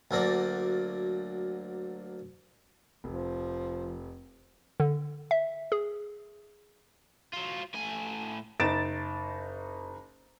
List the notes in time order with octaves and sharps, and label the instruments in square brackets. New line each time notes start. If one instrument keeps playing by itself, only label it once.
[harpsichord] D2 F#3 A#3 D5
[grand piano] F1 [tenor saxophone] F3
[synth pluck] D3
E5
G#4
[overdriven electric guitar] F#3 F4
A2 G#5
[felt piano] F#1 D#4 A6 D7 E7